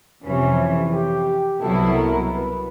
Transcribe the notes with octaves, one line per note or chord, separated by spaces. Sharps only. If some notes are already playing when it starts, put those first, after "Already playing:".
F2 C3 E3 C#4
G4
C2 B2 F#3 B3 E4 A4
A#4
B4